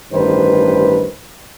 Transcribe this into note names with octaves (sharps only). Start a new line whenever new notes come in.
A1 G2 D#3 B4 C5